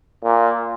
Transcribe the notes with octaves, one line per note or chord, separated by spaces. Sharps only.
A#2